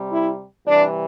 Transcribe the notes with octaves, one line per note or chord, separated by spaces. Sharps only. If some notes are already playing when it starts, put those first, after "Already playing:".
Already playing: C3 G3
E4
C3 E3 G3 D4